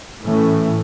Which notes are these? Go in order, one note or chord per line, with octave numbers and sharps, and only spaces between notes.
A2 E3 A3 C#4